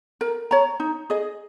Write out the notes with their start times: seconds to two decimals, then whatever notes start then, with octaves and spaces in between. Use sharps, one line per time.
0.21 A#4
0.51 C#5 A#5
0.80 D#4
1.10 G#4 D#5